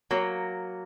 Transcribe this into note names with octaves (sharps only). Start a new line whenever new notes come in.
F#3 A#3